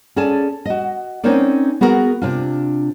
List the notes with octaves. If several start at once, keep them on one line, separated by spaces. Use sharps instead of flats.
C#4 G#4 A4 D5 G#5 A5
F#4 D#5
C4 C#4 D#4 A#4 C5 D5
B3 F#4 G#4 A#4
C3 D4 F4